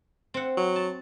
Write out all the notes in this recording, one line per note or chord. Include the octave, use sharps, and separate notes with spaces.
C4 F#5
F#3
A5